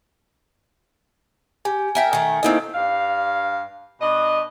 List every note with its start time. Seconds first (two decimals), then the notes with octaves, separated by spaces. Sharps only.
1.65 G4 G#5
1.95 A#4 E5 G5 G#5
2.13 D#3 A3 G#5
2.43 A3 A#3 C4 D#4 E4 D#5
2.74 G2 F5
4.00 B2 D4 D#5